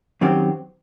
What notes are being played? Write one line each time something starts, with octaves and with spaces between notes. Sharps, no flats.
F#2 D#3 F#3 C4 G4